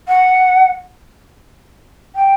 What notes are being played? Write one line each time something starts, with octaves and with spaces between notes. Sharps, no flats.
F#5
G5